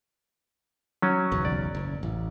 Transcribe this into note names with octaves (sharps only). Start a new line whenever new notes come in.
F#3 C#4
F#1 B1 E2
D5
F#1
A1